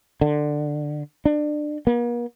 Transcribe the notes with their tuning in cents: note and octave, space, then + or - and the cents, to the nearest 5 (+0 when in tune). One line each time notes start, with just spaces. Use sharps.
D3 +15
D4 +25
A#3 +45